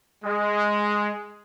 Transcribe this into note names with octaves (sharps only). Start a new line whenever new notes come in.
G#3